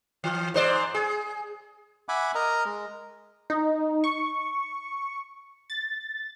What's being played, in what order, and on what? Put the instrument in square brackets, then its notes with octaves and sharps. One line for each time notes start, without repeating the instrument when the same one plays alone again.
[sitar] E3
G#2 C5 D5
G#4
[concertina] E5 F#5 G#5 B5 D6
A#4 D#5 A#5
G#3
[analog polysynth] D#4
C#6
A6